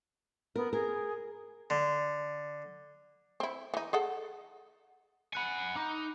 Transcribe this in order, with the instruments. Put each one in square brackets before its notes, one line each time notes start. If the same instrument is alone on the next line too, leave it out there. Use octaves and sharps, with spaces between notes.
[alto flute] B3 [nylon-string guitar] A#4
[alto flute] G#4 [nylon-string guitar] A#4
[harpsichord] D3
[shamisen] C4 E4
E3 D#4
G#4 A4 F#5
[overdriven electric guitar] F#5 G#5 [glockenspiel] B5 F#6 C#7
[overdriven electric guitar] D#4 [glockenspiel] D6